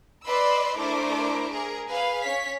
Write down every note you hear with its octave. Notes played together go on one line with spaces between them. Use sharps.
B4 D5 D#5 B5 C6 E6
A3 D4 E4 A#4 C5 D6
G#4 A#4
G#4 B4 F5
C#4 C#5 B6